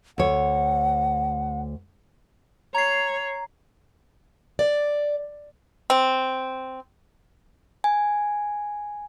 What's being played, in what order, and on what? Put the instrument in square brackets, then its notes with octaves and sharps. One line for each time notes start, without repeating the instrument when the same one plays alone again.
[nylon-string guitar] D2 C#5 [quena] F#5
[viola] C#5 [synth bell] A#5 C7
[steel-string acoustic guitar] D5
[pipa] C4
[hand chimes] G#5